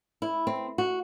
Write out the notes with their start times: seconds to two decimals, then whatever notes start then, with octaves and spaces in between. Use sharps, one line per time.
0.22 E4
0.47 C4
0.78 F#4